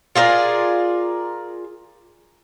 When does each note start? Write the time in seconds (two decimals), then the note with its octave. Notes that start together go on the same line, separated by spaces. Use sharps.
0.16 F4 G#4 A#4 D5